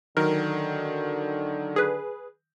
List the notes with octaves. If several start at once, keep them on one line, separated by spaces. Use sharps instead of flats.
D3 D#3 F#3 A#4
G#4 B4